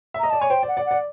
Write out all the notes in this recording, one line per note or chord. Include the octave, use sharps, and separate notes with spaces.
E5
D#5 A#5
D5 A5
C#5 G#5
C5 G5
D5
F#5
D5
F#5
D5